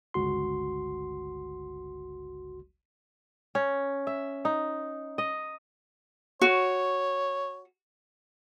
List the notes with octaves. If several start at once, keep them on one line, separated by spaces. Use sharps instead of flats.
G1 C#2 F#4 C6
C#4
E5
D#4
D#5
F#4 C#5